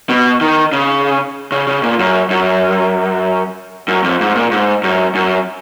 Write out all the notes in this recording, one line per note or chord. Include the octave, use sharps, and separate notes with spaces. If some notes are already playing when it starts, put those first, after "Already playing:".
B2
D#3
C#3
C#3
C#3
A#2
F#2
F#2
F#2
F2
G#2
A#2
G#2
F#2
F#2